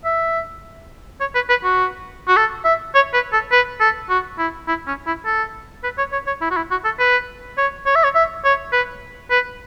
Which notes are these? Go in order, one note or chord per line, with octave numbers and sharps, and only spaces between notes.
E5
C#5
B4
B4
F#4
F#4
A4
E5
C#5
B4
A4
B4
A4
F#4
E4
E4
C#4
E4
A4
B4
C#5
C#5
C#5
E4
F#4
E4
F#4
A4
B4
C#5
C#5
E5
C#5
E5
C#5
B4
B4